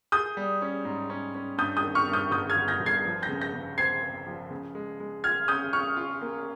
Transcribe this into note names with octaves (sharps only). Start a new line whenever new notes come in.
G#4 D#6 G6
G3
C#4
G#2
C#4
C#4
G2 D#6 G6
D#6 G6
D#3
C#6 F6
G2
D#6 G6
G1 D#6 G6
F6 G#6
G1
G6 A#6
G1
G#6 C7
F3
G6 A#6
C#3
G6 A#6
C#3
C4 G#6 C7
C4
F3
C#3
G#3
G#3
F4 F6 G#6
C#4 D#6 G6
C#4 C#6 F6
F4
A#3